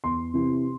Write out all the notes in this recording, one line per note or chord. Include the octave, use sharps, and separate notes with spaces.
E2 C6
C3 E3